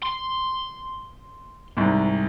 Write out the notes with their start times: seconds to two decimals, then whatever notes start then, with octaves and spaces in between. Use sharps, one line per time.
0.03 C6
1.77 C2 G#2